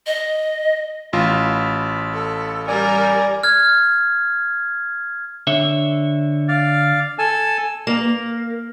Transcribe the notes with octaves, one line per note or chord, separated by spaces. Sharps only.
D#5
A1 F4 B5
A4
G3 A#4 D5 G#5
F6 G#6
D3 C#5 E5
D5 F5
A4 G#5 A5
A#3